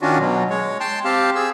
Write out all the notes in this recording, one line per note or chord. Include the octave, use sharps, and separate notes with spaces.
D#3 C#4 D4 F4 F#4
B2 F#3
G#3 C#5
G5 A5 C6
C4 G4 F5 A5
G#4 E6